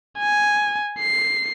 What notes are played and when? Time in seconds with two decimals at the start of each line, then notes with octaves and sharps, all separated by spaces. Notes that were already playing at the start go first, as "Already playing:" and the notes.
0.19 G#5
0.99 C7